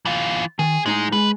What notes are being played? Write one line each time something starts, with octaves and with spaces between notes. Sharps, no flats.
E3 F4
D#3 G#4
A2 G#3 D#4 A#5
G#3 B4